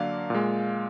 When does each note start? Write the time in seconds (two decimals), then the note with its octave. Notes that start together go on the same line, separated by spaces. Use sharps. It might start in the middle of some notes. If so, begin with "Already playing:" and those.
Already playing: D3 F#3 A#3 D5 F5
0.30 A#2 G#3